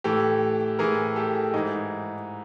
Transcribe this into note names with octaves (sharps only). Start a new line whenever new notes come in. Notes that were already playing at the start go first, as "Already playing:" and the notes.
A2 E3 G4 A4
A2 E3 G#4 A#4
G4 A4
G#2 E3 D#4